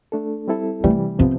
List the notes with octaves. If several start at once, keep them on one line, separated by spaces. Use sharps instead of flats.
A3 D4 A4
G3 C4 E4 A4
C3 E3 G3 A3
C3 F3 B3 C4